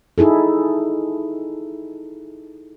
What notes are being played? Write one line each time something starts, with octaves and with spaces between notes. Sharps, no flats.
D#4 E4 G#4 A4